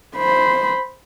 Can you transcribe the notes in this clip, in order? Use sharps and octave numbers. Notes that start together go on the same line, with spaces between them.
C5 B5